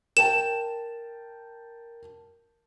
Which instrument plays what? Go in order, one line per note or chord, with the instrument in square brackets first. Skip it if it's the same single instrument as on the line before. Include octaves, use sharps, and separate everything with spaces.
[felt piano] A#4 G5 A5 [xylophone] E7